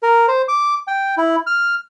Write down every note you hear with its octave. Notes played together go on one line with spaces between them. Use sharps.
A#4
C5
D6
G5
E4
F6